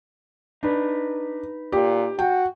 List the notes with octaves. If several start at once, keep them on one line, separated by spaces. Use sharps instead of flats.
D4 D#4 B4
A#2 G4
F#4 G5